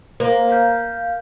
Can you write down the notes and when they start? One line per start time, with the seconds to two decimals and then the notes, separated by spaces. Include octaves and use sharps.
0.20 A#3 C5
0.50 F5 G6